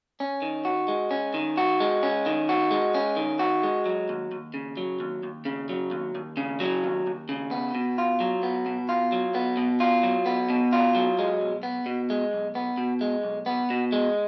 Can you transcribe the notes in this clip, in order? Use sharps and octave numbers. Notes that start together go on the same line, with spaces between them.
C#4
D#3
F#4
G#3
C#4
D#3
F#4
G#3
C#4
D#3
F#4
G#3
C#4
D#3
F#4
G#3
F#3
D#2
D#2
C#3
F#3
D#2
D#2
C#3
F#3
D#2
D#2
C#3
F#3
D#2
D#2
C#3
B3
B2
F4
F#3
B3
B2
F4
F#3
B3
B2
F4
F#3
B3
B2
F4
F#3
G#3
B1
B3
B2
G#3
B1
B3
B2
G#3
B1
B3
B2
G#3